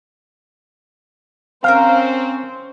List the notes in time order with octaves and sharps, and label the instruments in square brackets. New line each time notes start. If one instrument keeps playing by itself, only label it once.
[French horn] C4 [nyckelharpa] C#4 C5 [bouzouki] A#4 G5 A#5 [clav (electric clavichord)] F5